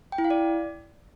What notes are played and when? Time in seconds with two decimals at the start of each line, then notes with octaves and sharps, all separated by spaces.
0.12 G5
0.18 E4
0.24 F5
0.30 D5